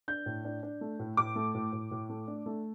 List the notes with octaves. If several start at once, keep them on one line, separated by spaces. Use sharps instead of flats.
D4 G6
A2
D4
D4
A3
A2
A2 D6
A3
A2
A2
A2
A3
D4
A3